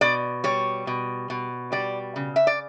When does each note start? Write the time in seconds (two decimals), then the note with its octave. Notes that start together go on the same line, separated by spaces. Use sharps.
0.01 B2 D5
0.44 G3 C#5
0.87 B2
1.30 B2
1.72 G3 D5
2.16 C#3
2.36 E5
2.47 D5